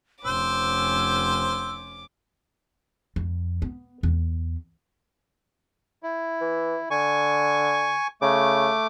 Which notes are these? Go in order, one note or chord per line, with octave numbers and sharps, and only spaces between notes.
F1 C#4 C5 D6 E6
F2
B3
E2
E4
E3
D3 G#5 C#6
C#3 A3 D6